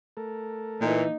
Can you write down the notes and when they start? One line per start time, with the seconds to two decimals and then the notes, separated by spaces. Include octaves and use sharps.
0.17 A3 A4 A#4
0.80 A#2 E3 A#3 D#4